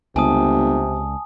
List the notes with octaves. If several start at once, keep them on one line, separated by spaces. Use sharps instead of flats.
G1 C#2 C3 G#5 A5 D#6